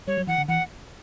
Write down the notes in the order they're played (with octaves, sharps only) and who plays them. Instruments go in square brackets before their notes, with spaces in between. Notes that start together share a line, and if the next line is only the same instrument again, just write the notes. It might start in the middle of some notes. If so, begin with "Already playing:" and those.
[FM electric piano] G3 [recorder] C#5
[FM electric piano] F#3
[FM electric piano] E3 [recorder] F#5
[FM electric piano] D3
[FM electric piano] E3 [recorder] F#5